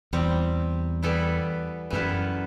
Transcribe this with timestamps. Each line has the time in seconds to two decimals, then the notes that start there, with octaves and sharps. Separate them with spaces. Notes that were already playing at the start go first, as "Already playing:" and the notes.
0.13 E2 C3 G3 C4
1.03 E3 G3 B3 E4 A4
1.90 F#2 E3 G3 B3 E4 A4